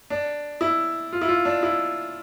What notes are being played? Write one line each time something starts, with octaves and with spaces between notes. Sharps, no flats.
D4
E4
F4
E4
F4
D4
E4